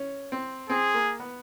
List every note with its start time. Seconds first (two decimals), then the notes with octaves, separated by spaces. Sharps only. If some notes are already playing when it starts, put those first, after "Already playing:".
Already playing: C#4
0.32 C4
0.69 C4 G#4
0.95 A#3
1.20 B3